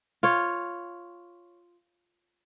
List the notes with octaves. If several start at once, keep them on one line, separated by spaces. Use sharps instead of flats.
F4 C#5